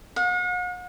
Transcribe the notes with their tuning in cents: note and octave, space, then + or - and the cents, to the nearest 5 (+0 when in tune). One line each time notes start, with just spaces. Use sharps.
F#5 -45